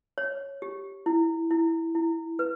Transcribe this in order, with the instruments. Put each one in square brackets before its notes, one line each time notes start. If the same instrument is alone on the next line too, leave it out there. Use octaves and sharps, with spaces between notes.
[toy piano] C#5
G4
E4
E4
E4
B4